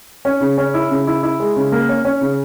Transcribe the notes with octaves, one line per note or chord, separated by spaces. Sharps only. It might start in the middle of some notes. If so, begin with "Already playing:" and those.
C#4
C#3
C#4
E4
C#3
E4
E4
G#3
C#3
A#3
C#4
C#4
C#3